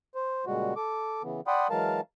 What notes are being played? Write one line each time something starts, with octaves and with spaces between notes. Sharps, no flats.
C5
A#2 C#3 G3 G#3 F#4
A4 D6
C#3 E3 B3
D5 F#5 G5 B5 C6 D#6
E3 F#3 G#3 A#4 F5 A5